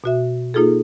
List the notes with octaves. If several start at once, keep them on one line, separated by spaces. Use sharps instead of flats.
B2 F#4 E5
A#3 D#4 F4 G#4 A4